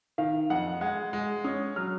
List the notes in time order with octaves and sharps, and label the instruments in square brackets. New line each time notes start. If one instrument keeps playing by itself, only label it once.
[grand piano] D#3 [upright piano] F5
[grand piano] F2 [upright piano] F#5
[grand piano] G#3 [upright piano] F#5
[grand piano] G#3
[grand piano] C#4 [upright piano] D#6
[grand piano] F#3 [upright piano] F6